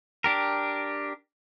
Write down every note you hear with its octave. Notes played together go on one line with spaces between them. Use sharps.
D4 G4 A#4